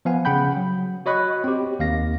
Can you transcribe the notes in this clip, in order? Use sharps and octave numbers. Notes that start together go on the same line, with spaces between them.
F3 B3 F5 G#5
C#3 F#5 G5 B5 G6
F#3
F#4 C#5 D#5 B5 C#6 F#6
C4 G4
D#2 F5 A#6